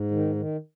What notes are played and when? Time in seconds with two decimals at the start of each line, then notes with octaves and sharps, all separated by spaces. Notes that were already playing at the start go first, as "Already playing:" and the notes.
Already playing: G#2
0.11 D#3
0.35 D#3